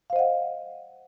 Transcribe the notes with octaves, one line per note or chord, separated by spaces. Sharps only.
C5 D#5 F5 F#5